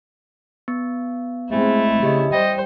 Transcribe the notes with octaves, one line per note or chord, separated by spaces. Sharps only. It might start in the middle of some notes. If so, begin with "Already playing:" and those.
B3
G#3 A3 C4 E4
C#3 G4 D#5
G3 C5 D#5 G5